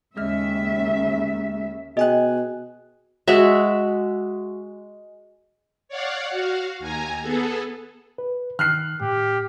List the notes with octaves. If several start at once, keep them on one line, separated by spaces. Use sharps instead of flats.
D#2 C#3 G#3 E5 F6
B2 G#4 D#5 G5 G#5 F#6
G#3 F#4 E5
C#5 D5 F5 F#5
F#4 F5
D#2 G#5 A#5
B3 G#4 A4
B4
D#3 F6 F#6 C7
A2 G4